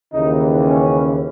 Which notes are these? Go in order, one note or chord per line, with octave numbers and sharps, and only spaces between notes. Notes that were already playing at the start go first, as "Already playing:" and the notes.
D#2 C#3 E3 D#4
C#4